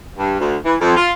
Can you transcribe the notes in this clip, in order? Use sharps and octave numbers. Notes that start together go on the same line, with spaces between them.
G2
D2
E3
F2
F4